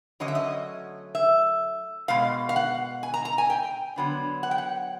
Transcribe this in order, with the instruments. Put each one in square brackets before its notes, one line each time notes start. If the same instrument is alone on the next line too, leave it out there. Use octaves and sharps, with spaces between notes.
[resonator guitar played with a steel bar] D3 F#3 A3 C#4 D#5
E5
D#5
E5
B2 G#3 F5
F5
F#5
G#5
A#5
A#5
G#5
G5
D3 F#3 B3 D4
F#5
G5
F#5